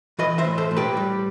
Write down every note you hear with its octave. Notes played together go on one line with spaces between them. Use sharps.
E3 B4 D#5
C5 E5
A2
A4 C5
A2
G4 B4
G3